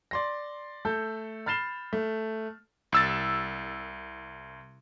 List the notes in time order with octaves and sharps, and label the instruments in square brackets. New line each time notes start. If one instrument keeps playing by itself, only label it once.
[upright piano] D5 C6 A#6
A3 A4 G6
B5 F6 A6 C7 E7 G7
A3
[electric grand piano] C2 E6 A6